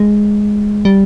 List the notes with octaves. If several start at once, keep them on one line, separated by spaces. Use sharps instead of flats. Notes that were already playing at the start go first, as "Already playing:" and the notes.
Already playing: G#3
G3